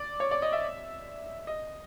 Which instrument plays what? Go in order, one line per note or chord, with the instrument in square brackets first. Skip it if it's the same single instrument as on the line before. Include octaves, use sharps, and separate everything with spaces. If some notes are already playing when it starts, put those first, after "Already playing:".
Already playing: [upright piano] D5
C#5
D5
D#5
E5
D#5